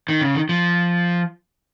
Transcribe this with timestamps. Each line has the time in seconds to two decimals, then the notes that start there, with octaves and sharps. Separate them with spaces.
0.09 D#3
0.21 C#3
0.35 D#3
0.49 F3